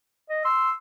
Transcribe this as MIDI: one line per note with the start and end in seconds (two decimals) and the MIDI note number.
0.29 0.43 75
0.45 0.70 84
0.45 0.73 88